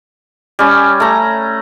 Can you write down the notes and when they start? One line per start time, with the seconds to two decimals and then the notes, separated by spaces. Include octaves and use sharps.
0.59 G3 C#4
1.00 A3 A#5